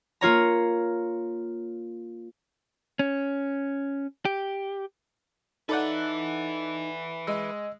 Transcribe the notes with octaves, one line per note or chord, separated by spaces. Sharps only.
A#3 F4 C#5 A#5
C#4
G4
D#4 A4 B4 D5 E5 F#5
G#3 D#5 E6